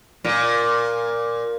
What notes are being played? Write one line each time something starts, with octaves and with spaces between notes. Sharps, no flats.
A#2